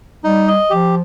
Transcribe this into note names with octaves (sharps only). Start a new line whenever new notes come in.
G3 D#4
D#5
F3 G4